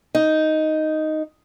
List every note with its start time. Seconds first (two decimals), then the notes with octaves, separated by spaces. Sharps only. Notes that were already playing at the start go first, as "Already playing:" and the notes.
0.15 D#4